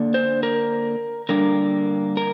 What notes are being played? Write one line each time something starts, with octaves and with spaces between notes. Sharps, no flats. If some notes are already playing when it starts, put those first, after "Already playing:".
Already playing: D3 A#3 D4
C5
A#4
D3 G3 A#3 D4 A#4
A#4